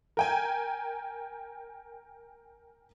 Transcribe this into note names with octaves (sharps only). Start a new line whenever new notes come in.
A#4 G5 G#5